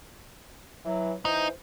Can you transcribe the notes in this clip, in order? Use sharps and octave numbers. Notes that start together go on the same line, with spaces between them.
E3 F#3
E3 D#4 C5